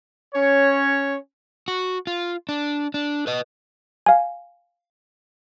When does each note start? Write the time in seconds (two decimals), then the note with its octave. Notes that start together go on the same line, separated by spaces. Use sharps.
0.34 C#4 C#5
1.68 F#4
2.07 F4
2.49 D4
2.94 D4
3.27 B4 D#5
4.06 F5 G#5